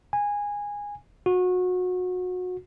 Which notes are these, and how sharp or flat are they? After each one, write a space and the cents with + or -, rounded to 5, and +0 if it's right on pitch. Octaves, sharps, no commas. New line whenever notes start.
G#5 -15
F#4 -25